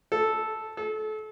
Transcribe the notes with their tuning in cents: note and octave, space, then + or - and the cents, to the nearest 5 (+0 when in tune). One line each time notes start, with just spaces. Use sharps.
A4 -5
A4 -30